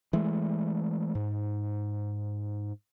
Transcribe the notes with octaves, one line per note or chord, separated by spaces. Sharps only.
E3 G#3 A3
G#2